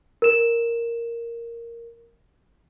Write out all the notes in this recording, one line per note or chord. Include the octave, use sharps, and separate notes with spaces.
A#4 E7